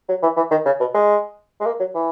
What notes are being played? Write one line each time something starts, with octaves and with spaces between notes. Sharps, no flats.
F#3
E3
E3
D#3
C#3
B2
G#3
G#3
A#3
F#3
E3